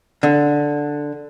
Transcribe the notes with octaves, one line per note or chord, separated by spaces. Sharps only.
D3